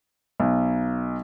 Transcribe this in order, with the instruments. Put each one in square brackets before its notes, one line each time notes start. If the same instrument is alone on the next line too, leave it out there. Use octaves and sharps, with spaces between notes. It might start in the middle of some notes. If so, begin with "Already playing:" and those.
[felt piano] B1